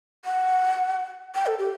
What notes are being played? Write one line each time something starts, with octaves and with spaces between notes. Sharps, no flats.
F#5
G5
A4
G4